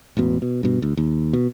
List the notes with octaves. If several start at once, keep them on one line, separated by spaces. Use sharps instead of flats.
E1 A1 B2
B2
G2 B2
D2
D#2
B2